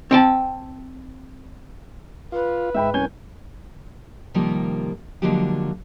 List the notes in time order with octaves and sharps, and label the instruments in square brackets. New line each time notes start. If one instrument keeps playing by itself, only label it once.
[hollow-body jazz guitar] C4 G5 A5
[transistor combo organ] F4 [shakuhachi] B4
[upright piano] G#2 G5 B5 [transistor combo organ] E5
[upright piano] C2 G6 G7 [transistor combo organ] C#4 G#5
[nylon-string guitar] C3 D#3 F3 G3 A#3
D3 F3 F#3 G#3 A#3 G4